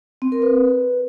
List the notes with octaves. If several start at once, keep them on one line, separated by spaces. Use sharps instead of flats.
C4
A#4
B4